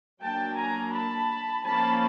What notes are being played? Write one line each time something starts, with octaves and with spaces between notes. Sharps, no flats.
F#3 A#3 D4 G5 A5
G#5 A#5
A5 B5
F3 A#3 C#4 A5 B5